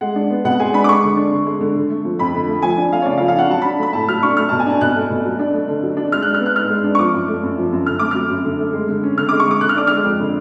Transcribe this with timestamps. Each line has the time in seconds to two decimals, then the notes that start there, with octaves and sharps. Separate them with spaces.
0.01 G#3 F#5
0.16 D4
0.31 B3
0.45 B2 F#5
0.60 G#3 G#5
0.73 D4 B5
0.84 D6
0.89 G#3 C#6
1.02 D3
1.17 D4
1.31 D3
1.46 G#3
1.61 D3
1.76 D3
1.90 A3
2.05 F3
2.19 F2 B5
2.34 D3
2.48 A3
2.62 F3 G#5
2.77 D4
2.91 A3 F5
3.02 C#5
3.06 C#3 D5
3.18 F5
3.20 F3
3.28 F5
3.36 D4 F#5
3.50 F#3 A5
3.62 D4 B5
3.79 A3 B5
3.93 A2 A5
4.09 F#3 F6
4.23 D4 C#6
4.37 A3 F6
4.49 B2 A5
4.59 G#5
4.66 D4 A5
4.81 B2 F#6
4.96 A3
5.10 B2
5.25 F#3
5.39 D4
5.53 A3
5.68 D3
5.83 F#3
5.97 D4
6.12 G#3 F6
6.22 D4 F#6
6.34 F6
6.40 B3
6.46 F#6
6.56 G#2 F6
6.70 G#3
6.84 D4
6.95 C#6
6.99 F3 D6
7.14 F#2
7.28 A3
7.43 F#2
7.58 F3
7.72 F#2
7.86 D3 F6
7.99 A3 D6
8.11 F#3 F6
8.30 F#2
8.44 D3
8.60 A3
8.73 G#3
8.88 D3
9.03 C#4
9.18 D3 F6
9.29 G#3 D6
9.40 C#6
9.46 D3 D6
9.61 D3 F#6
9.69 F6
9.76 D4 D6
9.87 G#3 F6
10.04 F2
10.20 D3